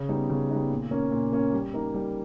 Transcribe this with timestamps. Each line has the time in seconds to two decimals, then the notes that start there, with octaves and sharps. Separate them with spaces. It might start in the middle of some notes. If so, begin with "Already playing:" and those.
Already playing: C#3
0.09 G3 B3 D#4
0.29 C#3
0.50 G3 B3 D#4
0.71 A#2
0.91 A#3 C#4
1.12 A#2
1.32 A#3 C#4
1.53 G3
1.74 A#3 D#4
1.94 G3